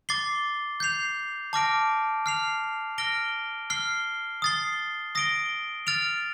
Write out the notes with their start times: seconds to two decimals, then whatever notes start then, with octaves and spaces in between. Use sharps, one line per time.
0.09 D6 A6 C7 G7
0.80 G6 C7 F7
1.53 A5 D6 F6 A#6 D7
2.26 F6 C7 F7
2.98 F6 A#6 D7 G7
3.70 F6 C7 G7
4.42 D#6 A6 C7 G7
5.15 D#6 A#6 D7 G7
5.87 F6 A6 D7 F7